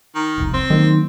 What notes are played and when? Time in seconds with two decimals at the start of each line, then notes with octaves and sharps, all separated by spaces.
0.15 D#3
0.38 E1 C2 F2
0.54 C4
0.70 D#3 F#3 G3 A#3